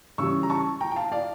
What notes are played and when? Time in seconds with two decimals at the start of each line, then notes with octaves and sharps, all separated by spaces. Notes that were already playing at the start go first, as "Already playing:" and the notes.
0.18 C#3 E3 G3 C#6 E6
0.43 A#5
0.50 A5 C#6
0.81 G5 A#5
0.92 G5
0.96 F5 A5
1.12 D5 F5